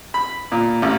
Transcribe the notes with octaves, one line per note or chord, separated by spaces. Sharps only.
B5
A#2
A1